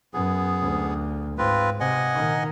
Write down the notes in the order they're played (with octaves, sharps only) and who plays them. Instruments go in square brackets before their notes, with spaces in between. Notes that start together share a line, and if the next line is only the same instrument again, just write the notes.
[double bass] F#2 [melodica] B3 G#4
[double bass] D2
[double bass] G#2 [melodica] C4 F4 B4
[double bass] C3 [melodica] D#5 F#5 G#5
[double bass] A#2 D#3